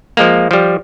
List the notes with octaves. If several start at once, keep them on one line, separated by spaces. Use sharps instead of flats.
F3 G#3 A#3
F3 G3